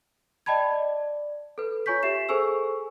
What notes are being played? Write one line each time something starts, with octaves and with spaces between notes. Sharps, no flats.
D5 D#5 G5 A5 B5 G#6
D5
A4 B4
F4 C#5 G#5 C#6 G6 B6
G4 E5 C7 E7
G#4 A4 C5 G#5 C#6 E6